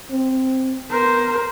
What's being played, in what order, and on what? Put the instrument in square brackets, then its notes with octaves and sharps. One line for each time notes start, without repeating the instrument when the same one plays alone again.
[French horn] C4
[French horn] B3 [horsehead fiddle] A#4 C5